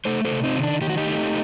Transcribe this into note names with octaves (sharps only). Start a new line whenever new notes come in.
A3 A4 C5
A4 C5
C3
C4 D#4
D#3
D4
D#3 G4
F#4
D#4 G4
A3